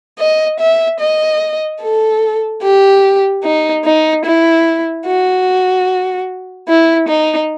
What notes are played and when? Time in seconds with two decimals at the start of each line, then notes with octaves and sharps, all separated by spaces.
0.19 D#5
0.60 E5
1.00 D#5
1.81 A4
2.62 G4
3.44 D#4
3.84 D#4
4.25 E4
5.06 F#4
6.68 E4
7.09 D#4